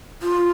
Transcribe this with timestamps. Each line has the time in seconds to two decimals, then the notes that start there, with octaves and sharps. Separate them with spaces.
0.22 F4